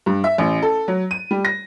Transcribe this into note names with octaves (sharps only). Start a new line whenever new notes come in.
G2
E5
A1
A4
F#3
D#7
G3
A#6